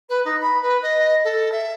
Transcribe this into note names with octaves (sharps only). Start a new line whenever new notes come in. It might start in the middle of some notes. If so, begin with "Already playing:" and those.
B4
D#4
B5
B4
D#5
A4
E5